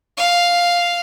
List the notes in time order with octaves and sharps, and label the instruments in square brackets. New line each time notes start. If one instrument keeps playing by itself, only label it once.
[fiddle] F5